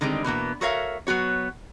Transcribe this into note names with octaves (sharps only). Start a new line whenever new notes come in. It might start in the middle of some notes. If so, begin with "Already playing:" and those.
D3 D#3 G3 G#3 C4
B2 E3 A#3 B3
F#4 A4 A#4 C#5 E5 F5
F#3 B3 F#4 C#5